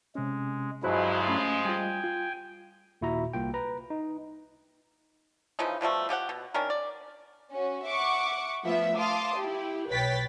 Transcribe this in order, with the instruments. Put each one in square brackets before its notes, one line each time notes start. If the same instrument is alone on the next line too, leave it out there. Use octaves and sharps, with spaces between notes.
[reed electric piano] C3 C#4 [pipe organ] G#3
[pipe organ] G2 F#3 E4 [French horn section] F3 G#3 [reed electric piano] F#4 C5 F#6
[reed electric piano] A3 C#4
[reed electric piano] G3 F4 [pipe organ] G5 G#5
[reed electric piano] F4
[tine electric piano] D#2 A#2 E4 F#4 E5 A#5
C2 A#3 F4 G5
B4 A#5
D#4
[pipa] C#3 E3 F3 D#4
B2 F3 G3 A3
F3 G4 G#4 F#5
B2
D#3 C#4 D4 A#4
D5
[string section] C#4 F#4
E5 F#5 C#6 D6
F3 A3 B3 E5
F5 A5 C6 D6 D#6
E4 G4
B1 B4 C#5 G5 A6 B6